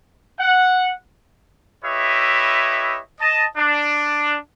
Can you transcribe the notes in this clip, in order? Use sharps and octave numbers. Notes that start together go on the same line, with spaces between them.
F#5
E4 G4 B4 C#5 D#5 E5
D#5 A5
D4